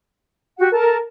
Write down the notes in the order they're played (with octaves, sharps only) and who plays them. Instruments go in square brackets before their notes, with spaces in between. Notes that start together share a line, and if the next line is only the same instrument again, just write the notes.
[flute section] F#4 G4 F#5
[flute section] A4 A5 [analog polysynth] A#4